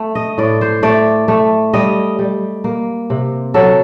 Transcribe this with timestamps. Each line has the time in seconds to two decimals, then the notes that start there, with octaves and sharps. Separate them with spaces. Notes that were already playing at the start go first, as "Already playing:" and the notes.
Already playing: A3
0.15 D#5
0.38 A2 D5
0.61 C5
0.83 A3 D5
1.28 A3
1.73 G3 D#5
2.19 G3
2.64 A#3
3.10 C3
3.54 F#3 A4